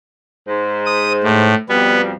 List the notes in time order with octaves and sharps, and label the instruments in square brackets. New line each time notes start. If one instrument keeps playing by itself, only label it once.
[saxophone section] G#2 C5
[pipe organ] D#6
A2
[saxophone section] F2 B2 G3 [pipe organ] B3